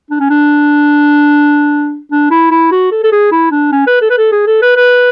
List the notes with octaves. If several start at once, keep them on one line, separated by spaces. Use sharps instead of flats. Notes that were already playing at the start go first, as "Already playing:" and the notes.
D4
C#4
D4
D4
E4
E4
F#4
A4
A4
G#4
E4
D4
C#4
B4
A4
B4
A4
G#4
A4
B4
B4